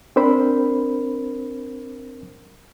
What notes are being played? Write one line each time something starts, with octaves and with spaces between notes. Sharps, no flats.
C4 D4 A#4 C5 B5